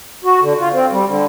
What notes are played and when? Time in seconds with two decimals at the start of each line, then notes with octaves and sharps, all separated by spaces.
0.24 F#4
0.41 D3
0.59 F4
0.72 C4
0.91 G3
1.07 D3